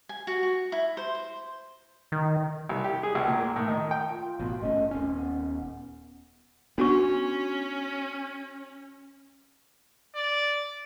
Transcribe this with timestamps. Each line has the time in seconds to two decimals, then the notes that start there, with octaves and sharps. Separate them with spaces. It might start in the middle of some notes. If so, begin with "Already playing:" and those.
0.09 G#5
0.27 F#4
0.43 F#4
0.72 E4
0.97 C5
1.15 C5
2.12 D#3
2.69 C2
2.84 G4
3.03 G#4
3.15 C#2
3.28 A#2
3.39 A#3
3.56 A2
3.68 D#3
3.91 G5
4.07 F4
4.40 A1 B2
4.61 G1 A3 C#4 D#5
4.91 D#1 C4 C#4
5.14 B3
6.78 B3 C#4 D4 F#4 C#6
10.16 D5